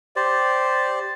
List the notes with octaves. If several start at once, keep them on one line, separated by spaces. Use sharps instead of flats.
G4 C5 D5